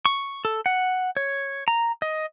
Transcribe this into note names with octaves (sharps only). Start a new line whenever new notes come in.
C#6
A4
F#5
C#5
A#5
D#5